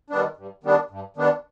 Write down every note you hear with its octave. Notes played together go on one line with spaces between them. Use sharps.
D#3 G3 B3 D4
G2
D#3 G3 B3 D4
G2
D#3 G3 B3 D4